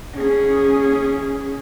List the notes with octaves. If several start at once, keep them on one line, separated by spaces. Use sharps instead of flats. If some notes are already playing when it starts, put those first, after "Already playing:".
C#4 G#4